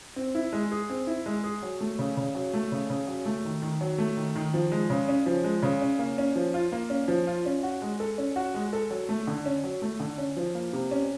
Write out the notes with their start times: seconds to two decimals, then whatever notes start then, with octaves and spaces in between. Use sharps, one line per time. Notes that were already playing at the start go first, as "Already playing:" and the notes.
0.16 C4
0.35 E4
0.53 G#3
0.72 G#4
0.90 C4
1.07 E4
1.26 G#3
1.44 G#4
1.63 F#3
1.81 A3
1.99 C#3
2.17 C#3
2.35 F#3
2.54 A3
2.72 C#3
2.90 C#3
3.07 F#3
3.26 A3
3.45 D#3
3.62 D#3
3.81 F#3
3.98 A3
4.17 D#3
4.36 D#3
4.54 F3
4.72 G#3
4.90 C#3
5.09 C#4
5.26 F3
5.44 G#3
5.63 C#3
5.82 C#4
5.99 A#3
6.18 C#4
6.36 F3
6.54 F4
6.72 A#3
6.90 C#4
7.08 F3
7.27 F4
7.46 C#4
7.63 F#4
7.82 G#3
8.00 A4
8.18 C#4
8.36 F#4
8.54 G#3
8.73 A4
8.91 F#3
9.09 A3
9.27 D3
9.46 C#4
9.64 F#3
9.82 A3
10.00 D3
10.18 C#4
10.37 F3
10.55 A#3
10.73 C3
10.91 C#4